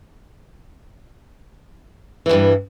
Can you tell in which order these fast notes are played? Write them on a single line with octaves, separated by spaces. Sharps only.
E3 E2 G2